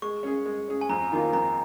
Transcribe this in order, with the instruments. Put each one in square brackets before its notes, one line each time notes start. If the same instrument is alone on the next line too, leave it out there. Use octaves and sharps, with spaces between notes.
[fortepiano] G#3 [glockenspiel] C#6
[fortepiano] C#4 G#4
G#3
C#4 G#4
[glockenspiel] G#5
[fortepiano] F2 [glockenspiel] A#5
[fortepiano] D#3 A#3 F4
[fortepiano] F2 [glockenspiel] A#5